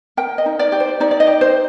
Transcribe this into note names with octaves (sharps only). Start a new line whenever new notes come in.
A#4 G5
D#5
D#4
D5
G4
C5
D#4 D5
D5
D#5
G4
C5